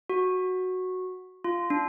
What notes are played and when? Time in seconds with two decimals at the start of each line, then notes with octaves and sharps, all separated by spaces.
0.09 F#4
1.44 F4
1.70 D4